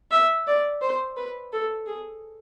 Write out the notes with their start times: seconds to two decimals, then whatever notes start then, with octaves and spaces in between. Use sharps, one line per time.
0.11 E5
0.47 D5
0.81 C5
1.17 B4
1.53 A4
1.87 G#4